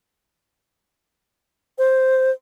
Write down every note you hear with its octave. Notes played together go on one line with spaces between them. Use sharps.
C5